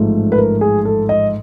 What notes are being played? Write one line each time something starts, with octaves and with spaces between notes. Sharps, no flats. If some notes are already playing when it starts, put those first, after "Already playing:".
Already playing: A1 G#2 F3 A3
B4
A#4
G#4
A4
D#5